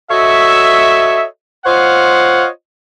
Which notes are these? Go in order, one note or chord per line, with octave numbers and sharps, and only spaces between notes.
F#4 A4 C#5 D#5 E5
F4 C5 C#5 D#5 F5 F#5